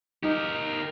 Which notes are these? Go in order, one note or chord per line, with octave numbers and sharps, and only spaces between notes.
D#4 G4 A#4